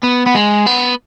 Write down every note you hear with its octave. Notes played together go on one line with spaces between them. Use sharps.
B3
B3
G#3
B3